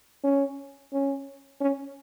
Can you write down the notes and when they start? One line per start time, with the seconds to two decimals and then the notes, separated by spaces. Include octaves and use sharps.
0.24 C#4
0.93 C#4
1.61 C#4